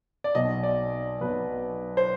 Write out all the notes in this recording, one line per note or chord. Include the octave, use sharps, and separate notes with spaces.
D5
B1 B2 F#3 D#5
D5
B1 B2 F#3 B4
C5